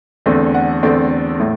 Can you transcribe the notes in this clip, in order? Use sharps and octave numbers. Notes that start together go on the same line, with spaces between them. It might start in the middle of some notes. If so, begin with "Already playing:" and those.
E2 D3 A3 C4
F#5
E2 D3 A3 C4 D5
A2